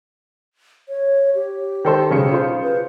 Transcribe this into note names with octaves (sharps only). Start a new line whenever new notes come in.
C#5
G4
D#3 A4 C5
B1 C#3 G#4 C#7
F4 C5
B4